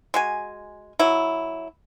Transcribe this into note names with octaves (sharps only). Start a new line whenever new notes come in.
G#3 F#4 G#5
F#3 E4